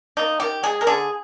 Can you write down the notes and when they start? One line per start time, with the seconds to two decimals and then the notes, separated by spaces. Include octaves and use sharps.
0.17 A#3 D#4
0.40 D#3 G4
0.63 G#3 G#4
0.81 A#4
0.87 D3 G#4